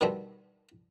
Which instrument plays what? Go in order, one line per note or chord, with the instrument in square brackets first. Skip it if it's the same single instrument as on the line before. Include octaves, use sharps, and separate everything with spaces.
[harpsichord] B2 D3 D#3 G3 A3 C4